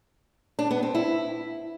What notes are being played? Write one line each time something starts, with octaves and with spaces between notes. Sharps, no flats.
D4
B3
C4
E4